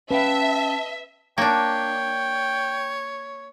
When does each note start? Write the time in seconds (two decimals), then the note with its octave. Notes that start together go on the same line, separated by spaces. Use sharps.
0.11 C#4 B4 E5 F5 G5 A5
1.38 A#3 D4 C#5 G5